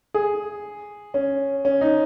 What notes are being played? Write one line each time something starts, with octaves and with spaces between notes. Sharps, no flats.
G#4
C#4
C#4
D#4